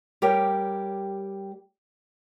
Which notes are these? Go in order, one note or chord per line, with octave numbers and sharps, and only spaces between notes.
G3 G4 A#4 C#5 G5